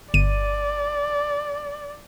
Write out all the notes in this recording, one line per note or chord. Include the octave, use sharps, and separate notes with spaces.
G1 D5 D#7